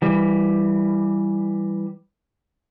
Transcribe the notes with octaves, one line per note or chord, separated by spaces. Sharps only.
E3 G3